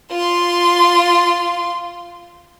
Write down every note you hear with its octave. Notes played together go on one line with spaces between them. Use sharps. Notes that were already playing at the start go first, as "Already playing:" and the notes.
F4 C6